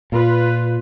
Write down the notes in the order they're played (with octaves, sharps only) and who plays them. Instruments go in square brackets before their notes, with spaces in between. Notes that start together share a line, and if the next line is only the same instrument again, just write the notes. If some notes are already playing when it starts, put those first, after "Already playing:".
[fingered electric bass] A#2 [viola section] F4 B4